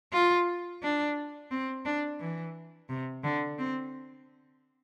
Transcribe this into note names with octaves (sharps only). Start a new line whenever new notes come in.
F4
D4
C4
D4
E3
C3
D3
C4